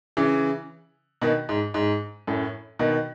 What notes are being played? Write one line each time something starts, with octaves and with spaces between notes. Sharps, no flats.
C#3 E3
B2 D#3
G#2
G#2
F#2 A2
B2 D#3